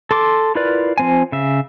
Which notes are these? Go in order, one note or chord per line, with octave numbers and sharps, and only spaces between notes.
A4 C6 D6
E4 F4 A#4 B4 D5
F3 C4 G#5
C#3 E5